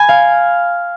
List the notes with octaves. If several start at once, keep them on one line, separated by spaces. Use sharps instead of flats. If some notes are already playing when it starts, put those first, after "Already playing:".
Already playing: G#5 B5
F5